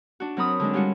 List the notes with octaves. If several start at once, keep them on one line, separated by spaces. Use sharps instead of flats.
D4 F#4
F#3 C4 A#4 B5 D#6
D3 G#3 D4
G3 C#4 F4 F#4